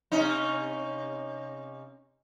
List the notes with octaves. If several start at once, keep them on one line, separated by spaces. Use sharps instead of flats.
C3 C#4 D#4